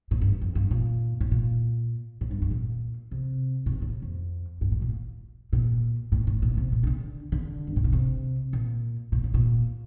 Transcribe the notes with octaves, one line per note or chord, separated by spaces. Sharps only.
A2
G2
F2
G2
A#2
A2
A#2
A2
G2
G2
A#2
C3
A#2
C3
A2
F2
G2
A2
A#2
A#2
A2
A2
A#2
C3
A#2
D#3
D3
D3
G2
A2
A#2
C3
A#2
A#2
A2
A#2